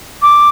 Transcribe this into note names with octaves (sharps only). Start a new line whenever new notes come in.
D6